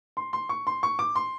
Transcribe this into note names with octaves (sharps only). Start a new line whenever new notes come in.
C6
C6
C#6
C6
C#6
D6
C6